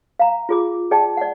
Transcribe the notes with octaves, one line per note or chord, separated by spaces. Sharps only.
F5 A#5
F4 G#4 D6
G#4 D5 G5 A5
D5 F#5